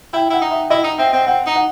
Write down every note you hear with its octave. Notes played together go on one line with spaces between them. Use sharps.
E4 G5
E4 F#5
D#4
E5
E4 D#5
D#4
C4 E5
C4
C4 F#5
D#4
F#5